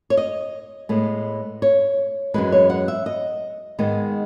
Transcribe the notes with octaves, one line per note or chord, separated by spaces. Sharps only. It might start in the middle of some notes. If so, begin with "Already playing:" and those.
C#5
D#5
A2 G#3 B3
C#5
F#2 E3 G#3 B4
C#5
F#5
E5
D#5
G#2 D#3 G#3 B3